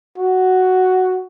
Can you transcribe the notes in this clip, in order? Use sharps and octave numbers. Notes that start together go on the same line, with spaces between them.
F#4